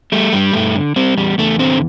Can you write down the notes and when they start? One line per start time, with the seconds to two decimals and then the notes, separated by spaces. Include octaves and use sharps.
0.12 G3 A3
0.33 G2 G3
0.53 G2 A3
0.75 D3
0.96 G3 C4
1.17 E2 G3
1.38 E2 A3
1.59 D3 C4